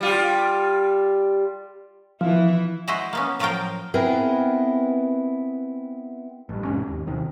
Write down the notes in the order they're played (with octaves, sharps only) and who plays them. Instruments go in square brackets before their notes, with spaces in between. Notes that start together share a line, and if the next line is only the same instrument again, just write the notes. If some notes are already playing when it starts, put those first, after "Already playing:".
[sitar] G3 F4 G4
[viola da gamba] E3 E4 [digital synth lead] F3
[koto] G#3 E4 F#4 C5 D#5 E5
A#3 B3 C#4
A2 F3 F#3 F4 A#4 G5
[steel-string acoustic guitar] B3 C4 E4 G#4 A#4 B4
[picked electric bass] A1 G2
E1 G#2 C3 C#4
D#2
D#1 C3 D#3